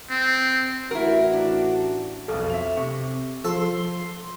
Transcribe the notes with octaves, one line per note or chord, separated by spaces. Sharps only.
C4
A1 E4 F#4 A#4
D4
B1 F2 A4
E5 F7
C3 C#6
F3 A4 C6